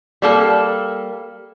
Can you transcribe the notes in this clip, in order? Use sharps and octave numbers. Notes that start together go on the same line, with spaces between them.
G3 A#3 A4